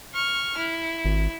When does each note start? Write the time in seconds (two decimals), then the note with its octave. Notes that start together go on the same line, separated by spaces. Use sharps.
0.14 C#6 F6
0.57 E4
1.05 G#1